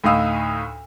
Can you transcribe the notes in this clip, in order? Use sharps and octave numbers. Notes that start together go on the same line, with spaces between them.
D2 A2 D#4 F5 D#6 E6